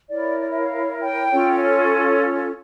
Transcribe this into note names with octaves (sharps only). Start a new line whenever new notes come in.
E4 A#4 C#5 D5
D5
E5
F5
G5
C#4 F4 A4 C#5
C#5